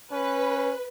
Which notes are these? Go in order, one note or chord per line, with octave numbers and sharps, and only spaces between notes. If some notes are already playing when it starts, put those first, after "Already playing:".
C#4 B4